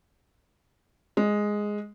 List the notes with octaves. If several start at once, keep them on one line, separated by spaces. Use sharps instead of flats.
G#3